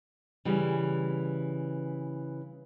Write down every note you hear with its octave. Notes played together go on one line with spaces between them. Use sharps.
C#3 E3 G3